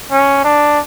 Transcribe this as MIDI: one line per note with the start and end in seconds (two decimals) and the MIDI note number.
0.12 0.41 61
0.44 0.79 62